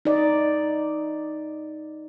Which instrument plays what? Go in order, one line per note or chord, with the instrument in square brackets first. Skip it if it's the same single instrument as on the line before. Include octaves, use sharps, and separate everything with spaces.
[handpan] D#4 D5 D#5